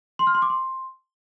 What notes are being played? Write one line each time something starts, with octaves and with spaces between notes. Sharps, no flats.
C6
F6
C6
D6
C6